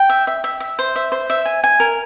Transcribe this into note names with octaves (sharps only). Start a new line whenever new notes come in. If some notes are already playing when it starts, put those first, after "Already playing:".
Already playing: G5
E5
E5
E5
E5
C5
E5
C5
E5
G#5
G#5
A#4